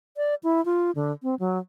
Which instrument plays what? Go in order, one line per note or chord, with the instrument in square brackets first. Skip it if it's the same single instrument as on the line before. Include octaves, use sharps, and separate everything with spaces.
[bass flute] D5
E4
F4
D3
C4
F#3